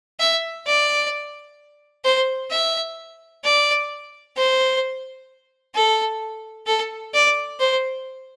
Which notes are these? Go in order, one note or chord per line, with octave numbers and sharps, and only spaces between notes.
E5
D5
C5
E5
D5
C5
A4
A4
D5
C5